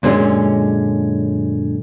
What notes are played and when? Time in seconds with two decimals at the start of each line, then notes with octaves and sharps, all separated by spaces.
0.03 F#2 A#2 D3 G3 G#3 C#4